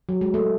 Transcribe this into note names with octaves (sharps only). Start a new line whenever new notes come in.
F#3
G#3
A3